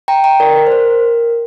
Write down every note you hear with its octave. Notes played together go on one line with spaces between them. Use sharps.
G5 A#5
G5 A#5
A#4 D5
A#4
C5
A#4